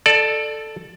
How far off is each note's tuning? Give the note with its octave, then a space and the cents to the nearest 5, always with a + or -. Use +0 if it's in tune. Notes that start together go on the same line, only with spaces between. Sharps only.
A4 +0 D5 +20